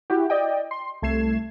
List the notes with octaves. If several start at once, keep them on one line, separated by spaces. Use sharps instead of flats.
E4 F#4 G4
D5 D#5 G5
C6
C2 A3 G#6 C7 E7